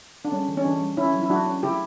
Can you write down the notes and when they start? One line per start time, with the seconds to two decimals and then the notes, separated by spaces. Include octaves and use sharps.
0.25 D4
0.32 G3 C#4
0.48 E3
0.57 C#4
0.65 E3 D4
0.81 G3
0.97 C#4 E4
1.14 F#3
1.22 E4
1.30 F#3 D4 F#4
1.46 C#4
1.63 C#3 E4 G4